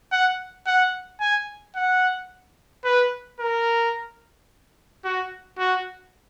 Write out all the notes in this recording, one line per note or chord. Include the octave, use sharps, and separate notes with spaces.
F#5
F#5
G#5
F#5
B4
A#4
F#4
F#4